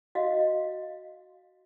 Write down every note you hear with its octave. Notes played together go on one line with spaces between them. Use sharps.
F#4 D#5 F5